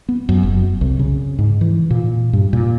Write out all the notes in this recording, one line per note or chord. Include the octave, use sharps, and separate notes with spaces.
B3
F#2
F#1
F#2
C2
C#3
G#2
E3
A#2
G2
A#2